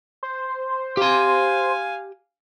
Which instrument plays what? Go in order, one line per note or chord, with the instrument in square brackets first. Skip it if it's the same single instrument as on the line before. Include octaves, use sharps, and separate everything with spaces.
[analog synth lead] C5
[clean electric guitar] G4 C6 [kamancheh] F5 G#5